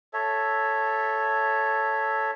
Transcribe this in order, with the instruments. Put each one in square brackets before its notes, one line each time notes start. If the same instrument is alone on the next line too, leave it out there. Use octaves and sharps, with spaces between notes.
[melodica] A4 C#5 E5